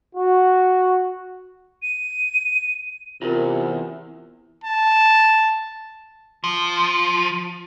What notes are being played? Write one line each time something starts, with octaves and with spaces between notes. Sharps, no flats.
F#4
D#7
E2 C3 F4 A#4
A5
F3